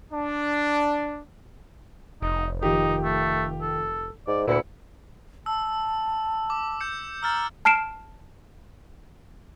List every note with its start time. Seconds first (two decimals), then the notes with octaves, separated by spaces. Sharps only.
0.12 D4
2.22 F1 D#4
2.63 D#3 F3 D#4 G4
3.04 A3
3.61 A4
4.27 G#2 D5
4.47 D2 A#2 E4 B4 C#7
5.46 A5 E6
6.50 D6
6.81 G6 C#7
7.23 A#5 E6 F6 A6
7.65 A5 F6 C7 D7 E7